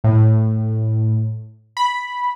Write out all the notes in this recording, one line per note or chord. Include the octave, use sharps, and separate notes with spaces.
A2
B5